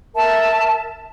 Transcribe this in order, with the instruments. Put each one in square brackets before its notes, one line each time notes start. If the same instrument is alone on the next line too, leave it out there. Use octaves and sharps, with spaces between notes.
[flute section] A#4 E5 A5